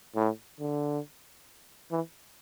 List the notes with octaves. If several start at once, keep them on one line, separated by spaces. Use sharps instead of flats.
A2
D3
E3